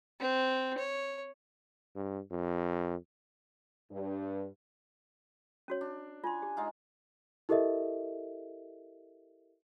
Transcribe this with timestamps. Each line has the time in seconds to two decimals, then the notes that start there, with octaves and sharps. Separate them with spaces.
0.20 C4
0.78 C#5
1.96 G2
2.31 F2
3.91 G2
5.68 C#4 F#4 C#5
5.81 D4
6.24 F4 G#5 C6
6.42 G4
6.57 G#3 D#4 F4
7.49 E4 G4 A4 A#4 D#5 E5